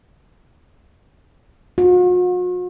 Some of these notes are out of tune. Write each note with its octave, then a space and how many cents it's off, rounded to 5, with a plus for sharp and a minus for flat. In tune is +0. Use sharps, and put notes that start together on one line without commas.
F#4 -45